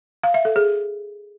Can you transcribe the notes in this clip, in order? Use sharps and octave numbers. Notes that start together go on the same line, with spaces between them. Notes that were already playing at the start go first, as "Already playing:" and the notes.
F5
E5
A4
G#4